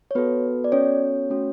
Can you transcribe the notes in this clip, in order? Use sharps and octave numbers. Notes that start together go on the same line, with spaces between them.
C#5
B3 F#4 A4 B4
D5
C#4 C#5
A3 C#4 F#4